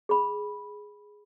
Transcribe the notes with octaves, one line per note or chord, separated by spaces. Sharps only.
G#4 B5